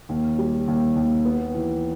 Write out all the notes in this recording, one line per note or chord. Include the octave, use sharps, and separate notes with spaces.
D#2
G3
D#2
D#2
B3
E3